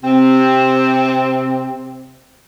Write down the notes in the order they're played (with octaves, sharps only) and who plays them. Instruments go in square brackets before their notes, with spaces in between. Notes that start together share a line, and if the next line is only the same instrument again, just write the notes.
[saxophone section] C3 C4